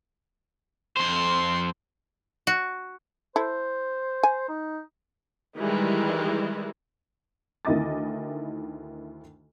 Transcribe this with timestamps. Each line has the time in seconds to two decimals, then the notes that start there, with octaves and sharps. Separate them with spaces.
0.97 F2 C5 C6
2.47 F#4
3.36 E4 A4 C5
4.23 G#5
4.49 D#4
5.58 D#3 E3 G3 G#3
7.65 D2 D#3 E4 D#5 D6 A6